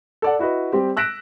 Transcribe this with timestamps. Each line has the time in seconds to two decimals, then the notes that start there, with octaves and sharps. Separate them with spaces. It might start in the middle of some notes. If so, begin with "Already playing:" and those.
0.22 A4 D5 F#5
0.39 E4 F#4 B4 D#5
0.72 G3 C4 G4
0.97 E6 F#6 A#6 B6 D7 E7